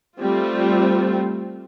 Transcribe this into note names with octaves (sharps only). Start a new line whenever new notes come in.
G3 A3 C4 F4